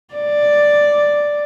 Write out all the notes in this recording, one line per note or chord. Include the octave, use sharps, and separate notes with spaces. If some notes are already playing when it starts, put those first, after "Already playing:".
D5